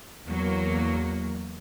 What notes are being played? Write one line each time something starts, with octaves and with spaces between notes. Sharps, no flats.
E2 F#3 A#3